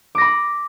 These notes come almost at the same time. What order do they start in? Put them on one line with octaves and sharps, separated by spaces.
D6 A#6 B5